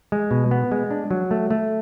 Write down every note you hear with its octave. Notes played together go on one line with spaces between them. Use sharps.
G#3
B2
B3
G#3
D4
F#3
A3
A3